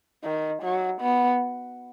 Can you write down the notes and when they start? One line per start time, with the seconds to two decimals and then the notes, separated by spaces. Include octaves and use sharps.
0.24 D#3
0.62 F#3
1.01 B3